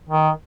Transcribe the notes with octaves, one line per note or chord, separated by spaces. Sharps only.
D#3